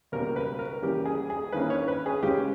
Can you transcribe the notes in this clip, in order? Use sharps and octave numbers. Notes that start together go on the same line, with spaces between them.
C#2 B2 G3 A#3 A#4
B4
A#4
C#2 C#3 E3 G3 A#3 G4
G#4
G#4
G2 D#3 A#3 C#4 E4 B4
C#5
B4
G#4
C#2 C#3 G#3 C#4 G4